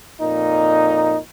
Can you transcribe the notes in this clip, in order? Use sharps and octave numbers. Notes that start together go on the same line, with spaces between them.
F2 A#2 D#4